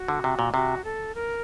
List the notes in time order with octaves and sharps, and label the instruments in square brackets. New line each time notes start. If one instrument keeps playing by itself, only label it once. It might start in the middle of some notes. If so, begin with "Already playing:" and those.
Already playing: [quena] F#4
[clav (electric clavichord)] D3
C3
A#2
[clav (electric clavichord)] C3 [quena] F#4
[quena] A4
A#4